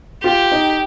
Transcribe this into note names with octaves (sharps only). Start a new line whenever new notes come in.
F4 G4
D#4